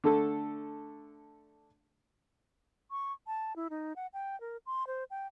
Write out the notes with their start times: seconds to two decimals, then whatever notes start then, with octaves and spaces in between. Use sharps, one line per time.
0.04 D3 A3 A4
2.91 C#6
3.27 A5
3.56 E4
3.70 D#4
3.96 F#5
4.13 G5
4.41 A#4
4.66 C6
4.87 C5
5.10 G5